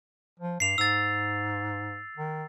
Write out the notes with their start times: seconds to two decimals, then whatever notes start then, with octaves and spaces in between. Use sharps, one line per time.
0.40 F3
0.60 G2 C7 F7
0.78 G#2 E6 A6
2.16 D#3